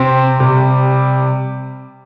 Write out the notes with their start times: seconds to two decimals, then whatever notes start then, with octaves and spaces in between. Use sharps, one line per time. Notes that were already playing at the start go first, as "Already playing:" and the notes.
Already playing: C3 C4
0.40 C3 G3